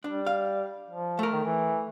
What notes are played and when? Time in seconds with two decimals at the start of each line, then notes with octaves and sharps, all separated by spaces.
0.04 G3 D4
0.26 F5
0.89 F3
1.19 A3 A#4
1.33 D#3
1.45 E3